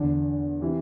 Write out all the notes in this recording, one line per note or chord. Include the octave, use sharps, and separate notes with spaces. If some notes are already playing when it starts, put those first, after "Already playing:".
Already playing: E2 D3
C3 E3